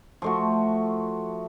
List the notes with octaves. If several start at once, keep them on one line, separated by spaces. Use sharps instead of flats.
F3 A3 F#4